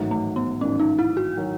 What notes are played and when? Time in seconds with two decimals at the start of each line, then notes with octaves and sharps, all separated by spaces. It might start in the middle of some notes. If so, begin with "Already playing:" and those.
Already playing: A1 G#2 D#3 F#3
0.11 A3
0.36 B3
0.61 A1 G#2 D#3 F#3 C#4
0.79 D#4
0.99 E4
1.17 F#4
1.37 D#3 F#3